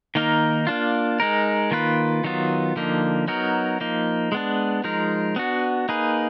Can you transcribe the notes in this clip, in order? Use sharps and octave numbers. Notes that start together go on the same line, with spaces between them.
D#3 A#3 D#4 A#4
A#3 D4 F4
G#3 D#4 A#4
D#3 A#3 F4 B4
D#3 F#3 B3 F4
D3 F3 A#3 D#4
F#3 B3 D#4 F#4 A#4
F3 A#3 D#4
G#3 B3 D4
F3 G#3 D#4 A#4
B3 D4 F#4
A#3 D#4 G#4 B4